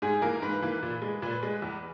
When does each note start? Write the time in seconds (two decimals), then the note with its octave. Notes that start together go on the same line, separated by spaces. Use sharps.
0.02 G#2 G#4
0.22 E3 A#3 A#4
0.42 G#2 B4
0.62 E3 A#3
0.83 A#2
1.02 G#3
1.22 A#2 B4
1.43 G#3
1.62 E2